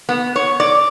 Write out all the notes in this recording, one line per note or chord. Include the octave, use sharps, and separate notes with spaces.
B3
C#5
D5